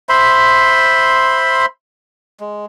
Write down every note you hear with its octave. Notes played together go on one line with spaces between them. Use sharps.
C5 E5 B5 C6
G#3